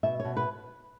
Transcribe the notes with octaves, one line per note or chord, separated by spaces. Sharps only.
B2 E5
B2 C#5
B4